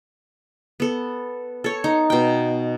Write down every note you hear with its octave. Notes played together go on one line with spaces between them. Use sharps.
B3 A4
A4 C#5
D#4
B2 G5